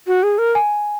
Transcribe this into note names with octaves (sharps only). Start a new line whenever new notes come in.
F#4
G#4
A#4
G#5